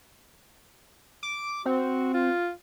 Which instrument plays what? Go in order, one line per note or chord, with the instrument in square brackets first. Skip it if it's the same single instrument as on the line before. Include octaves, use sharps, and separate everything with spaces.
[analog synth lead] D6
[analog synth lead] C4 [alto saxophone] F#4
[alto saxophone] F4